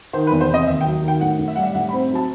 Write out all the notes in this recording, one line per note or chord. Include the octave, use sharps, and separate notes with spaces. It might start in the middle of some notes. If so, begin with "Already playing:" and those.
D#3 C5
B4
E2
C5
C3 D#5
D#2 E5
G5
F#3
D#3 G5
A2 F#5
A2
E5
G3 F#5
E5
A2 F#5
B5
C4
F#3 A5